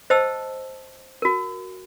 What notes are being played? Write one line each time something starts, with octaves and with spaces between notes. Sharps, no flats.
C5 D#5 G5 A5 E6
F#4 A#4